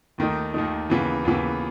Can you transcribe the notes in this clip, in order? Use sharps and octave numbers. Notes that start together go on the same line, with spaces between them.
D#2 D#3 A3 D#4
D#2 D#3 A3 D#4
D#2 C#3 E3 B3
D#2 C#3 E3 B3